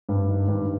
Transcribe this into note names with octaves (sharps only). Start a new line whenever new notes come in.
G2
D#3
G2